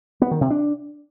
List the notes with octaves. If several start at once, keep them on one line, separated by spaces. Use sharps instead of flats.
B3
D#3
C3
D4